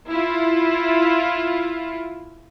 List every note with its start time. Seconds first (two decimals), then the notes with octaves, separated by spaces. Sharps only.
0.10 E4 F4